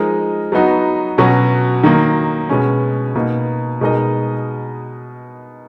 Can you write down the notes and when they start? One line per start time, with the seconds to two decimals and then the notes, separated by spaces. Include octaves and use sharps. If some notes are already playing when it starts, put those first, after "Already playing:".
Already playing: F3 G#3 D#4 A#4 D#5
0.52 F#3 B3 D#4 F#4
1.18 B2 F#3 C#4 F#4
1.83 D#3 F#3 A#3
2.49 B2 G#3 C#4
3.15 B2 A#3 D#4
3.81 B2 G#3 D#4 A#4 D#5